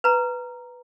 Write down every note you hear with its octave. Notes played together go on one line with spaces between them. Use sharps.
B4 A#5